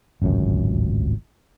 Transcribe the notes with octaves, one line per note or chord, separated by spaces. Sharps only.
D1 G#1 C#2 F#2